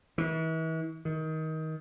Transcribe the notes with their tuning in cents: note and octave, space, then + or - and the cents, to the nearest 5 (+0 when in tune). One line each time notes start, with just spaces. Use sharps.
E3 -40
D#3 +20